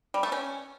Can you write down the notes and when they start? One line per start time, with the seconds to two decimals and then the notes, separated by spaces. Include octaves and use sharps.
0.14 G3
0.23 A3
0.32 C#4